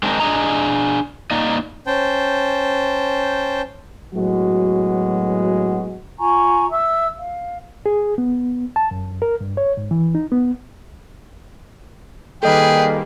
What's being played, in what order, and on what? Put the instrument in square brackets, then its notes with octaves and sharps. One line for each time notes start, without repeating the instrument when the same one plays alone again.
[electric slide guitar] G#3 C4 D4 D#4 F#4 A#4
D4 G#4 D#5 A#5
A#3 D#4 D5 D#5
[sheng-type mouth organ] C#4 C5 G5 A5
[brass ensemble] A2 F#3 G#3 B3 F#4
[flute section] F4 G#5 A#5 C#6
E5 E6
F5
[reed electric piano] G#4
B3
A5
F#2
A#4
G2
C#5
G#2
E3
D#4
B3
[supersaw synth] D#3 G3 A#3 [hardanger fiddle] G#4 B4 [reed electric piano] A4 D#5 [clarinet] G5